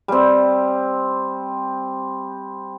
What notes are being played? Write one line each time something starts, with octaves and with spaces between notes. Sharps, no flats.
G3 C4